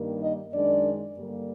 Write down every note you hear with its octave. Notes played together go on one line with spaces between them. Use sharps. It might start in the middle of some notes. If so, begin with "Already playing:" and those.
Already playing: G2 D#3 G3 A#3
D#4 D#5
F#2 D#3 G#3 D4 D5
G2 D3 G3 A#3